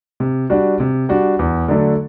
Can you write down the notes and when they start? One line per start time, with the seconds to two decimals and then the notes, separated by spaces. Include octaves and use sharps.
0.20 C3
0.50 G3 D4 F#4
0.80 C3
1.09 G3 D4 F#4
1.39 E2
1.68 D3 F#3 A3 D4